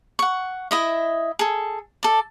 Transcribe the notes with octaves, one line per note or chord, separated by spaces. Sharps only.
F#5 C#6
E4 D#5 E5
G#4 A4
A4 D5